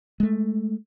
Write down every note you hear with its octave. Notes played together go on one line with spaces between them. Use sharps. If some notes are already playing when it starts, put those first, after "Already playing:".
G#3 A3